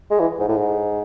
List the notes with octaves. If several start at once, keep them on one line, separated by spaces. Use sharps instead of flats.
G#3
E3
G#2
A2
G#2